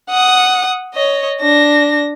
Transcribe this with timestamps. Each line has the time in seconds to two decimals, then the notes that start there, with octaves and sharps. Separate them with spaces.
0.10 F#5 D#6
0.94 C#5 D#5
1.42 D4 A#6